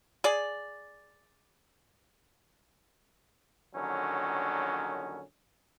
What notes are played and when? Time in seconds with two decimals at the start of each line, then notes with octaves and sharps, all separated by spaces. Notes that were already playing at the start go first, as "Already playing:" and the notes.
0.24 G#4 D5
3.75 A#1 D3 D#3 F#3 C#4